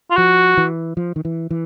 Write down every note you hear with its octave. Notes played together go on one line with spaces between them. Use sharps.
F4
F3 F#4
E3
F3
D#3
E3
E3